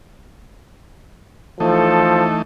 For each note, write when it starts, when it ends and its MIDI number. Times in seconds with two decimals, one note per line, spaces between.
1.60 2.42 52
1.60 2.26 53
1.60 2.42 57
1.60 2.42 63
1.60 2.39 69